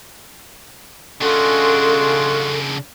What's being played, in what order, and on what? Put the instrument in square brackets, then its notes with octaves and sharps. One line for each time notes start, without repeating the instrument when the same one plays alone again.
[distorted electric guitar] C#3 D4 [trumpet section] G#3 F4 F#4 [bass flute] A4